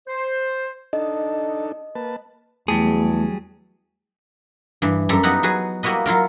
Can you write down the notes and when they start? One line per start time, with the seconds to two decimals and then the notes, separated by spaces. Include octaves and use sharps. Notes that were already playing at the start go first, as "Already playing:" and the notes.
0.08 C5
0.93 D4 D#4 A4 D#5
1.95 A#3 B4 A5
2.68 E2 F#3 G3 A3 G#4
4.82 G2 E3
5.09 F#2 G3 A4 A#5
5.23 G3 B3 D#4 E4 F#4 F#5
5.43 F#3 F#4 G#4 B4
5.83 G3 A#3 E4 F#4 B4 D#5
6.06 F#3 E4 F4 A#4